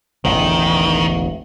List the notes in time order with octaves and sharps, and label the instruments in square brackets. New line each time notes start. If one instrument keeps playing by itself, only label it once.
[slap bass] E1 A1 D3 [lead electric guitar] D#3